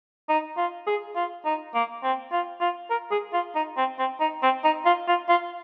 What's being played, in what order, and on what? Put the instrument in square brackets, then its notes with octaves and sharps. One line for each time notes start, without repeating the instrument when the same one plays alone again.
[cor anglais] D#4
F4
G#4
F4
D#4
A#3
C4
F4
F4
A#4
G#4
F4
D#4
C4
C4
D#4
C4
D#4
F4
F4
F4